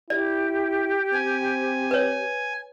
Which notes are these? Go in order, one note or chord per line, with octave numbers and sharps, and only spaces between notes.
E4 G4 D5
C4 G#5
B4 C#5